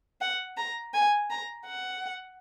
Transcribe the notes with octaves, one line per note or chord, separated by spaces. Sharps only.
F#5
A#5
G#5
A#5
F#5